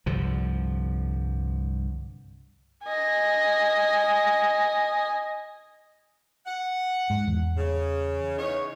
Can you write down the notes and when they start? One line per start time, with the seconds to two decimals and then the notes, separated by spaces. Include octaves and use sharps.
0.06 C2 G2 D3 F3
2.85 D#5 G#5
6.46 F#5
7.10 G#2
7.28 E2
7.56 C#3
8.38 E2 D#4 C#5